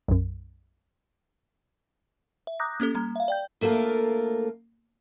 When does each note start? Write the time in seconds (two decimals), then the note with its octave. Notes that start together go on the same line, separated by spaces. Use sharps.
0.08 B1 F#2
2.47 E5
2.60 A#5 D6 D#6 F#6 G6 A#6
2.80 A#3 C#4 G4 A4
2.95 G3 A#3 A#5
3.16 E5 F5
3.28 D5 G5 G6
3.61 D2 A3 A#3 F4 A#4